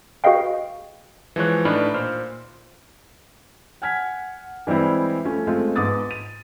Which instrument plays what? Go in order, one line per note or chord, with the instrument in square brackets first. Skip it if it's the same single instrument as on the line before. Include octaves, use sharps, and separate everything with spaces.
[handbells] F#4 G#4 B4 D#5 F5 G5
[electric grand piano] E3 F3 G#3 C#5 F#6
A2 D4 D#4 B4 B5 F6
A#2 C5 F6
[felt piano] F#5 G#5 F6 G#6 B6
E3 G3 G#3 C4 E4
F3 A3 C#4
G#3 A3 C4 F4
G#2 B3 D6 D#6 A6
D#7